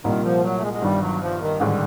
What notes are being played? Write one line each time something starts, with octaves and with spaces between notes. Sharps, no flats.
C2 A#2 D#3 G3 A#3
F3
F#3
A3
G#3
G#3
G1 G2 D#3 G3
F#3
F3
D#3
A1 G#2 D3 D#3 G3